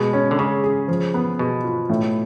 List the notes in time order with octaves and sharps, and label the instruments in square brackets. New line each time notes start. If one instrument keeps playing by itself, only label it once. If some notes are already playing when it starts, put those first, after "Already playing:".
Already playing: [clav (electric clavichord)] B2 [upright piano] G#3
[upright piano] C#4
[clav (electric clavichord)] D3
[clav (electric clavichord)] C#3 [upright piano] G#3
[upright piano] G#4
F3
B3
[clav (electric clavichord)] B2 [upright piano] G#4
[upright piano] F4
A2